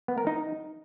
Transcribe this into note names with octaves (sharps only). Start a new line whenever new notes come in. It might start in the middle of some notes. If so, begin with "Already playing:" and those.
B3
A#4
D#4